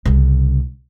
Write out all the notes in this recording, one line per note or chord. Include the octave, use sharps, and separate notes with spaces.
C2 C#3